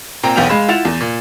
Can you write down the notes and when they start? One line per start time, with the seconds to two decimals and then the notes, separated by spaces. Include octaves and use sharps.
0.23 A#2 C4 G5 A#5
0.36 B1 E2 B3 G5 G6 F7
0.49 G#3 F5 B5 E7
0.68 E4 F4 F#5 A6 E7 F7
0.85 E2
1.00 A#2